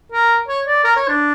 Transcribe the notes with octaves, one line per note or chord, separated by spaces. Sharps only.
A#4
C#5
D5
A#4
C#5
D4